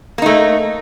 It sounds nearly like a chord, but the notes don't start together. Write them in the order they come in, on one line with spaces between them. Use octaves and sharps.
A#3 D#4 A3